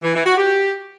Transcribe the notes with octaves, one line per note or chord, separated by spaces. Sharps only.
E3
E3
F#4
G4